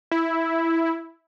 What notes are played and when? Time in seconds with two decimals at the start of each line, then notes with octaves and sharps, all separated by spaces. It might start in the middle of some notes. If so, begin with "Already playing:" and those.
0.11 E4